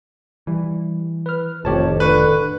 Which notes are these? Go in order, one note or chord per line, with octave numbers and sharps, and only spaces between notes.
E3 G3
B4 F6
F1 F2 A2 D#3 G4 C#5 A5
D3 B4 C#6 F#6